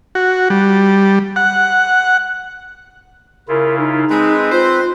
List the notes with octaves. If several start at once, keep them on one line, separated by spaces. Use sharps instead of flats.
F#4
G3
F#5
C#3 E4 F4 A#4
D#4
G#3 C4 B4
F4 C5